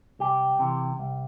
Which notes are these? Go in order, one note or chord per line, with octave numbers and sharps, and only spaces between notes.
C2 G4
C3 E3
C2